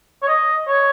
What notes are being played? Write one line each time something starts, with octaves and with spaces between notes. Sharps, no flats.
C#5
D#5
C#5